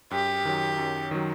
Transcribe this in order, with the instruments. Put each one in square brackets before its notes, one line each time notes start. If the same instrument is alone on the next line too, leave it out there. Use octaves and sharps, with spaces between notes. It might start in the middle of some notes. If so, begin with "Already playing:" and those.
[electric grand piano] F#2 [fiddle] G4
[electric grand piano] D#3 F#3
F#2
D#3 F#3